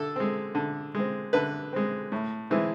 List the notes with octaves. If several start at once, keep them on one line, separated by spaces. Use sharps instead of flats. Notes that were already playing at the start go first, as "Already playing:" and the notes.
Already playing: D3 A4
G#3 C4
D3
G#3 C4
D3 B4
G#3 C4
A2
E3 G#3 C4